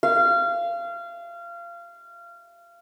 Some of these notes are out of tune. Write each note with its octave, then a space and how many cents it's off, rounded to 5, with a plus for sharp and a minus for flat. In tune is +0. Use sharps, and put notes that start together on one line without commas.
F5 -25